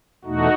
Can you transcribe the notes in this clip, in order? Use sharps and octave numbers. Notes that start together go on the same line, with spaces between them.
E2 B2 A3 D#4 F#4